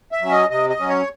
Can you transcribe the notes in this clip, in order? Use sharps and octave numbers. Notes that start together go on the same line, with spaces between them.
E5
F#3 C#4
D#5
C3 D#5
D#5
F#3 C#4
C#5